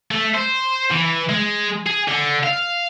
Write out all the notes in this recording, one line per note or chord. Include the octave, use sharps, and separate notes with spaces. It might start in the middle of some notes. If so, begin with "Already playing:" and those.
A3
C5
E3
G#3
G#4
D3
F5